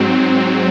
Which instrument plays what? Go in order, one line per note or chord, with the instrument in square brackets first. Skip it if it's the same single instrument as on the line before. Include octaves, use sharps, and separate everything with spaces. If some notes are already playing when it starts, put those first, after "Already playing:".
Already playing: [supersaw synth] G#2 F#3 C4